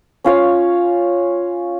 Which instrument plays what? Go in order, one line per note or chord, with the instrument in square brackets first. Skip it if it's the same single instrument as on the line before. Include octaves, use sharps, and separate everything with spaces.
[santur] C#4 F4 C#5 F5